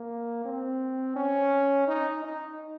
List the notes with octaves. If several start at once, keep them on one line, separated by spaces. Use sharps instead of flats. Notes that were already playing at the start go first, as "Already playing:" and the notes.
Already playing: A#3
C4
C#4
D#4
D#4